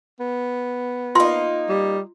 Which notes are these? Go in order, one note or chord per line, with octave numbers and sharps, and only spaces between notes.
B3
A#3 D#4 F4 C6
G3